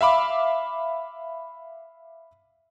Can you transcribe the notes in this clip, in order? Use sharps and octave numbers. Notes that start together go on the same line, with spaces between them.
E5 F5 B5 D6